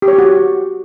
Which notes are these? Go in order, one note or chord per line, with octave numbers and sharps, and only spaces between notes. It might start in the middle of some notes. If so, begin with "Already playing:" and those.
G4
C#5
G4
F#4